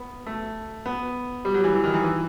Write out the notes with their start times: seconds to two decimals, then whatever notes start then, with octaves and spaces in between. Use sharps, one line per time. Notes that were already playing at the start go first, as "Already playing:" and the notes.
Already playing: B3
0.26 A3
0.86 B3
1.45 G3
1.54 F#3
1.64 E3
1.74 E3
1.84 D#3
1.94 E3
2.04 E3